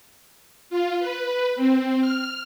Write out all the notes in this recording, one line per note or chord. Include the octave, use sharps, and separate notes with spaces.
F4
B4
C4
F6